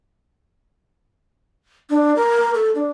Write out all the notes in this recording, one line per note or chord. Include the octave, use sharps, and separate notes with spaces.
D4
A#4
A4
D4